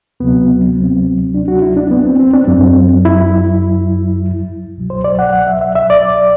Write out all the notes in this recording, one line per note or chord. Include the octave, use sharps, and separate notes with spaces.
D2 C3 F#3 B3
C4
D4
F#4
E4
D4
B3
C4
C4
D4
F#2 F#3 C4
E4
C2 B2 F#3
C5
D5
F#5
F#5
E5
E5
E5
D5